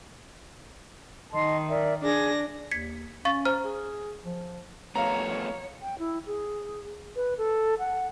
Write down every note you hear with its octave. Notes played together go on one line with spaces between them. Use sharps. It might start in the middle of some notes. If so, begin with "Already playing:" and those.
D#3 D#5 A5 C6
A#4 D5 E5
D4 G#4 A#6
D#2 G#6 B6 C#7
C#4 F5 C#6 A6
C5 A#5 F6
G#4
F3
F3 A3 B3 C#5 F5 A#5
G5
E4
G#4
B4
A4
F#5